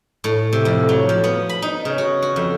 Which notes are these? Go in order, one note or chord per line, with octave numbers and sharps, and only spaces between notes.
A2
C3
F2
F#3
F3
B3
B5
D#4
C#3
F#4
F#4
F2